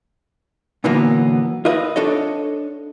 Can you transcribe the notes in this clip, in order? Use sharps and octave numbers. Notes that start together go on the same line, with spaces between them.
A#2 D3 E3 F#3 A#3 B3
F4 A#4 B4 D#5 E5
D4 A4 C#5 D#5